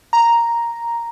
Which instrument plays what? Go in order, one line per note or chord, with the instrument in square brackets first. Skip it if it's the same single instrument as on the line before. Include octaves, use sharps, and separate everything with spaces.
[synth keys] A#5